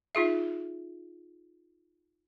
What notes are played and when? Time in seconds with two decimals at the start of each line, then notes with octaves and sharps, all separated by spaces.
0.15 D#4 F4 G#4 E5